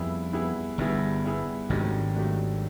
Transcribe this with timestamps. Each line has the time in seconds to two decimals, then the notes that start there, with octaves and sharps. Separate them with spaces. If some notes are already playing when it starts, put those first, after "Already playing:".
Already playing: F2 G3 B3 E4 G#4
0.33 G3 B3 E4 G#4
0.78 G1 G2 G3 B3 E4 G#4
1.24 G3 B3 E4 G#4
1.69 G#1 G#2 D#3 F#3 A3 D4 G4
2.15 D#3 F#3 A3 D4 G4